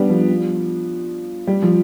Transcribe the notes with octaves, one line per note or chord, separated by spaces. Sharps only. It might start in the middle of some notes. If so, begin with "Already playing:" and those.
Already playing: G3 B3 D4
F3
G3
F3